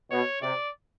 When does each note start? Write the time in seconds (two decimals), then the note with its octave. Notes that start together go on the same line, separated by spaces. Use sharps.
0.11 B2 C#5
0.42 C3 D5